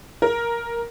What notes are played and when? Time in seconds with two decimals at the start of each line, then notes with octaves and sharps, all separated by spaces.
0.22 A#4